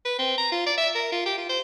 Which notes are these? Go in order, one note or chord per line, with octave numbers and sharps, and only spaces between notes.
B4
C4
A#5
F4
D5
E5
A#4
F4
G4
F4
C5